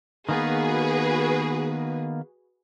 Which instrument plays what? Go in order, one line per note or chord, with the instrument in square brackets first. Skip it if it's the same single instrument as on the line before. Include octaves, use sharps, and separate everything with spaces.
[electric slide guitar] D#3 A#3 B3 [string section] F#4 G#4 B4